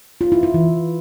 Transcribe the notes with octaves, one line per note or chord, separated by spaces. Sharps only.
F4
E4
E4
E3